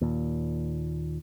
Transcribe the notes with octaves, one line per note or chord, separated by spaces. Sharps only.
D#2 A#2